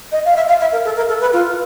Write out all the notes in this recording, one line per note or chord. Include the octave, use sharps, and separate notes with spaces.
D#5
F5
E5
F5
E5
A#4
A4
A#4
A4
B4
F4